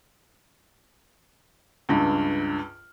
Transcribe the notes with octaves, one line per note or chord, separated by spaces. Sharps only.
C#2 G2